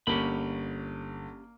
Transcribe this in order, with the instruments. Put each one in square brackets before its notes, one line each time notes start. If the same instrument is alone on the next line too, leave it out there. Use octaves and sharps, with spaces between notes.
[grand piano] G1 [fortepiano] A#3 [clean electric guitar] C#4 G4 B5